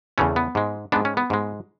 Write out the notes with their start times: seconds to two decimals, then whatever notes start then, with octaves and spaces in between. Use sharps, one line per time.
0.18 E2 C#3 E3 A3 C#4
0.36 B3
0.55 G#2 G#3
0.92 G#2 G#3 B3 D4
1.05 C#4
1.17 B3
1.30 G#2 G#3